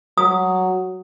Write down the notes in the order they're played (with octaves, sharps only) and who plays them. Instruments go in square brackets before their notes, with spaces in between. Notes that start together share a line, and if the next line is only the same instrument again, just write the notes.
[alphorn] F#3 [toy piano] D#6